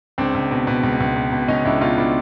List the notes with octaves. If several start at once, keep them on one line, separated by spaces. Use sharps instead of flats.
C#2 C4 D4
C#2
B2
B2
C#2
C#2
B2
B2
C#2 C#4 D#4
C#2 D4 E4
B2 D#4 F4
B2 D4 E4